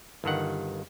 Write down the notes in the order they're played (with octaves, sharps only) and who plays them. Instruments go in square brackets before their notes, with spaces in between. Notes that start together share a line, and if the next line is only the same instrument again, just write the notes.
[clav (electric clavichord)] G1 G2 D#3 F#5